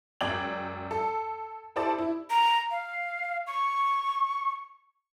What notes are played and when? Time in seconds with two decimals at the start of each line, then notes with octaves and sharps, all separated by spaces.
0.21 C#2 F#2 D5 G5 G#6 F#7
0.91 A4
1.76 E4 G4 A4 C5 D5 A5
1.99 E4
2.30 A#5
2.71 F5
3.47 C#6